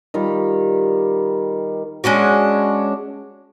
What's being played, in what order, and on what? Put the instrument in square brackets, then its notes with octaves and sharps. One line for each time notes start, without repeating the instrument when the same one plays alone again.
[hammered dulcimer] D#3 G3 F4
[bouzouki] G#3 C#4 D4 F#4